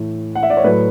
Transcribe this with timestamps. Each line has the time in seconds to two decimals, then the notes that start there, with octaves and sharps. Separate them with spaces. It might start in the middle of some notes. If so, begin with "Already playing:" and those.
Already playing: A2 E3
0.35 F#5
0.43 E5
0.50 D5
0.57 C#5
0.64 A2 F#3 A3 B4